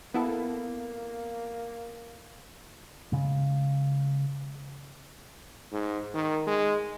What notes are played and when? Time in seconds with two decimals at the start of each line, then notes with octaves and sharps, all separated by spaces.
0.14 A#3 B3 E4 A4
3.12 C#3 G#3
5.72 G#2
6.14 D#3
6.47 G#3